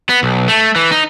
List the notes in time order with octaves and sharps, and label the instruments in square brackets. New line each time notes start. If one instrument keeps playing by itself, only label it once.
[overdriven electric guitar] B3
B1
A3
E3
D#4